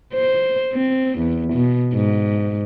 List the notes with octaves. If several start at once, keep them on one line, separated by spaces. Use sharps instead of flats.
C5
C4
E2
B2
G#2